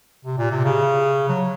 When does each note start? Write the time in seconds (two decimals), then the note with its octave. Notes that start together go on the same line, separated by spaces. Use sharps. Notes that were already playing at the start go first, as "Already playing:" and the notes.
0.25 C3
0.38 A#2
0.51 C3
0.64 C#3
1.29 F#3